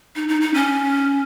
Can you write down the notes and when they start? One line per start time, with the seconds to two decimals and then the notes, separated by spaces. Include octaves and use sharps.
0.16 D#4
0.29 D#4
0.41 D#4
0.54 C#4